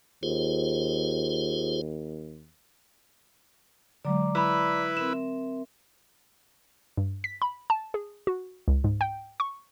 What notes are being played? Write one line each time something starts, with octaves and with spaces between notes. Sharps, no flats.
D#2 F4 G#4 C5
D3 F#3 G#3 D5 A#5 D6
E4 B4 B5 E6
C4 A#4 E5 E7
G2
B6
B5
A5
G#4
F#4
C#2
G#2
G5
C#6